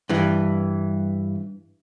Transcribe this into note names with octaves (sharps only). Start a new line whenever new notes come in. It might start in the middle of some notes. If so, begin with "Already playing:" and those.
G2 E3